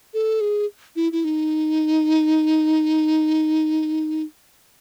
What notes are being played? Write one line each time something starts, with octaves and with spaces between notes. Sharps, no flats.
A4
G#4
E4
E4
D#4